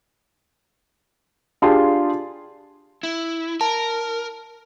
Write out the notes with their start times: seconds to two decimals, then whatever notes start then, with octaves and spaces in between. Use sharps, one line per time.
1.62 D4 F4 G4 G#4 A5 C6
3.03 E4
3.61 A#4 A5